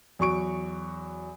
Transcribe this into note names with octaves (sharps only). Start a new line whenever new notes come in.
E2 F#3 C#6 D7